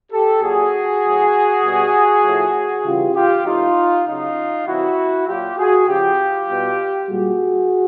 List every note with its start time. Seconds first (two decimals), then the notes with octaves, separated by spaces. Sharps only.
0.12 G4 A4
0.42 A#2 F#3 F#4 G#4
1.04 A2 F#3
1.63 B2 G3
2.24 A2 F3
2.85 C#3 E3 G3 F4 G4
3.15 F4 G4
3.45 A2 F3 D#4 F4
4.05 C#3 F#3 D#4 F4
4.67 C3 E3 G3 E4 F#4
5.27 A#2 F#3 F4 G4
5.58 F#4 G#4
5.88 C#3 F3 F4 G4
6.48 B2 G3
7.09 A#2 G3 F#4 G#4